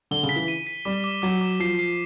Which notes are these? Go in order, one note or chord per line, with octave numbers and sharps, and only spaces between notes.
D3 G7
C#3
B6
E3
D#7
B6
G3 D6
D6
F#3 D6
D6
F3 C7
C7